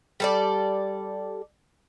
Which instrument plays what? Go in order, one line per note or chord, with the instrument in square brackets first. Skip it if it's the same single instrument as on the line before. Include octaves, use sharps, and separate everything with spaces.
[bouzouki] G3 A4 D5